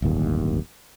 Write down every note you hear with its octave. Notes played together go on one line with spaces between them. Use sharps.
D1 G1 D#2